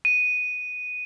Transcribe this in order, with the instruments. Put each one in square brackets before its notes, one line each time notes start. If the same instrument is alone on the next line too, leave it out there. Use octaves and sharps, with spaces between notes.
[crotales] D#7